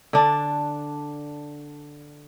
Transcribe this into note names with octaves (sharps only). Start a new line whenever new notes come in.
D3 D4